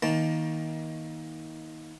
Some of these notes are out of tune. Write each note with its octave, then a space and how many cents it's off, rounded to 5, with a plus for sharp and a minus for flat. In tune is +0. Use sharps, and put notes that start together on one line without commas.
D#3 +25 A#3 +20 A5 +0